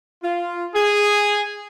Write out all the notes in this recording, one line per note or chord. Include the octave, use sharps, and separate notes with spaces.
F4
G#4